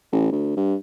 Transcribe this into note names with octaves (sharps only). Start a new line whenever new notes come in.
A1
D2
G2